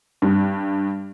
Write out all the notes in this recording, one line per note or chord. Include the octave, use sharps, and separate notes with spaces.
G2